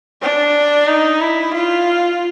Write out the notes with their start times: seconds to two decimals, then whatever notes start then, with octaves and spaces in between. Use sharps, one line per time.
0.22 D4
0.88 D#4
1.21 E4
1.54 F4